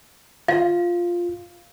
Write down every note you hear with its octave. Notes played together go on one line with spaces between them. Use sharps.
F4 F5